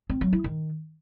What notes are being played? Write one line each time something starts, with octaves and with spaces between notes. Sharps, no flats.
C4
F#3
E4
D#3